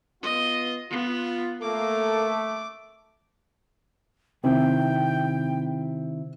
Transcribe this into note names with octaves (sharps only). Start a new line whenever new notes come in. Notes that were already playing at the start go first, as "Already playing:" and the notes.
B3 F4 D#5
B3 F4
A3 A#3 A4 D6
C3 D#3 C4 E4 G5